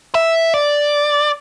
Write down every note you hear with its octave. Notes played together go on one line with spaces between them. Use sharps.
E5
D5